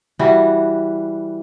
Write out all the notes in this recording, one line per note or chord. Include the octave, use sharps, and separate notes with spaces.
E3 G3 F#4